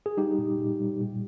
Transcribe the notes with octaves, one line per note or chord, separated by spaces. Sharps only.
G#4
G3 D#4 G4
A#2
A#2
G3
A#2